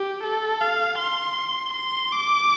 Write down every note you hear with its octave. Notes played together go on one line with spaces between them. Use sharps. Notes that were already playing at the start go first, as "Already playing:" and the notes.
Already playing: G4
A4
F5
C6
C6
D6